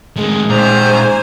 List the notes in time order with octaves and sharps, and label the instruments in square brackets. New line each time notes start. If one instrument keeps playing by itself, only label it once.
[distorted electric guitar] A2 D#3 [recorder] G#3
[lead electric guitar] A#2 D#3 [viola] C5 G#5 [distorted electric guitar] A#5